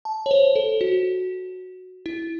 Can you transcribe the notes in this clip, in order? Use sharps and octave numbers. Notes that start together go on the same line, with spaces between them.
A5
C#5
C5
A4
F#4
E4